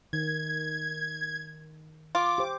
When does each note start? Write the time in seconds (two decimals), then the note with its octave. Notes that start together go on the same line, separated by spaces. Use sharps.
0.13 D#3 G#6
2.15 F4 D6
2.38 G4 C5